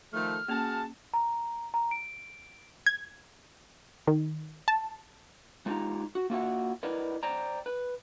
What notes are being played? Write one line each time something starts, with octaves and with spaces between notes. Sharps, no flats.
D#3 F3 A3 F6
A#3 C#4 F#4 G#4 A5
A#5
A#5
D7
G#6
D#3
A5
G#3 D4 D#4 F4 G4 A#5
F#4
A#3 F4 F#4 A4 E5 F#5
E4 A#4 B4 D5 D#5
C5 D5 G5 A#5
B4